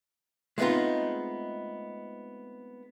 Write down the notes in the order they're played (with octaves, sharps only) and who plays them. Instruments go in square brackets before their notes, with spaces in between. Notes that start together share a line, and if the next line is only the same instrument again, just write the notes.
[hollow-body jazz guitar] G#3 A3 B3 C4 D#4 F4